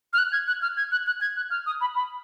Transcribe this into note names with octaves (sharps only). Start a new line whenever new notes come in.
F6
F#6
G#6
F#6
F6
G#6
F#6
F#6
G#6
F#6
F6
D#6
B5
B5